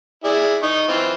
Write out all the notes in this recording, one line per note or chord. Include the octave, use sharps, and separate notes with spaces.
E4 G#4 D5
D#4 C#6
E3 C4 F4